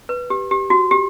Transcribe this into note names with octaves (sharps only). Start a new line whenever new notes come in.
B4
G4
G4
F#4
G4